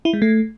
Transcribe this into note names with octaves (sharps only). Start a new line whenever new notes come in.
E4
G#3
A3